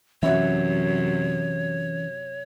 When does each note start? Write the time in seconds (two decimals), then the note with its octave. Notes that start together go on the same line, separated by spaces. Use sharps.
0.23 F#2 C3 E3 C#4 F#4 C#5 E5